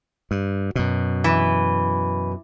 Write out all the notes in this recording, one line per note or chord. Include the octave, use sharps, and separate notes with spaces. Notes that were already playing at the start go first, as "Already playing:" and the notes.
G2
F#2 B2
E3